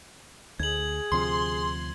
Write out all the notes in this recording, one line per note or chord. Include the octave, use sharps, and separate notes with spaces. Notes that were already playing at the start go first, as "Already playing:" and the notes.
D2 G#4 G#6 F#7
D2 C3 F3 C6